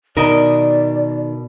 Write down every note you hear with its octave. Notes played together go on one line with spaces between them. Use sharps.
B2 D#3 A#4 D5 D#5